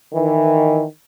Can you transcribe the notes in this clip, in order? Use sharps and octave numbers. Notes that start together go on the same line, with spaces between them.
D#3 E3